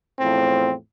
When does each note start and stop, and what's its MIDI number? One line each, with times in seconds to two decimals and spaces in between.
0.18 0.73 40
0.18 0.73 45
0.18 0.73 53
0.18 0.73 60